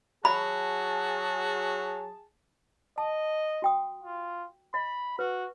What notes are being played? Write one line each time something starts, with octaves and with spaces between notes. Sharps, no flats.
F#3 F#4 G#4 A5 B5
D#5 A5
F#4 G5 D#6
F4
D#5 B5
F#4 B4